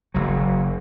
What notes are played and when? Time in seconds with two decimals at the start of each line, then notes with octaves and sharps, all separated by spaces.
0.14 F#1 F#3